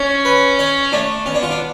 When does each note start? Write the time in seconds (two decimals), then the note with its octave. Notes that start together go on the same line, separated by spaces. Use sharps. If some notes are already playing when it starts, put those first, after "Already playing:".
Already playing: C#4
0.25 B4
0.59 C#5
0.92 A3 D4
1.26 B3 C#4
1.35 D4
1.43 F4
1.50 D4